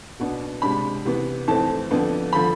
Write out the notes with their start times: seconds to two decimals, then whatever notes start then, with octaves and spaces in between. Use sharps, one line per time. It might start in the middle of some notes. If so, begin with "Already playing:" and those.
0.19 B2 B3 D4
0.62 C3 G#3 D4 B5
1.05 C3 E3 B3
1.48 F2 E3 A3 C4 A5
1.91 F2 D3 F3 B3 D4
2.33 D3 F3 B5